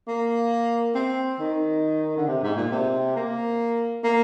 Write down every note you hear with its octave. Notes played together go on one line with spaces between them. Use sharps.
A#3
C4
D#3
D3
C3
G#2
A#2
C3
A#3
A#3